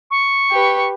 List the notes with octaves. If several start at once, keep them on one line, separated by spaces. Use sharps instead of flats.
C#6
G4 B4